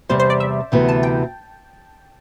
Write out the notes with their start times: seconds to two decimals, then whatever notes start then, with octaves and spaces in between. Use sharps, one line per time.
0.09 E2 C3 G3 C4 C5
0.19 C5
0.30 D5
0.40 E5
0.72 D2 C3 E3 B3
0.88 A5
1.03 G5